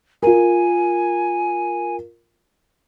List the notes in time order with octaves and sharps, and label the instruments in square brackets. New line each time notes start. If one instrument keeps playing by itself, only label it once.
[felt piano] F4 A#4 [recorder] G#5